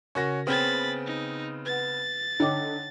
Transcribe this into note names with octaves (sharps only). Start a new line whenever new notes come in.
C#3 C#4 F#4 A#4 C#6 A#6
C#3 B3 C4 G5 B5 A6
D#4
B4 F#5 A6
D3 D#4 C#5 G5 D6